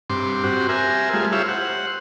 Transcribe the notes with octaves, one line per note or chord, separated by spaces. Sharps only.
G2 C4 C6 D6
C4 F#4 G4 C5
A#4 C5 E5 G#5
G3 A3 F4 G#4
E4 G4 C5 C#5 E5 F5
C5 F#5